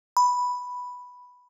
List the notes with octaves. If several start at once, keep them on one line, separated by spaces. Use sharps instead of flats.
B5